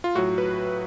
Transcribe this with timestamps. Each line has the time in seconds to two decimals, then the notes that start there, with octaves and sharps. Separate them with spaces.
0.04 F4
0.15 A2 F#3 F#4
0.38 B4